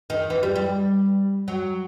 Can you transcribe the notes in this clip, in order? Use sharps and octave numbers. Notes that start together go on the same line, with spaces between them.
D#3
E3
G3
G3
F#3